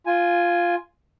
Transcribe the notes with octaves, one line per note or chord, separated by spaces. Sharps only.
F4 G#5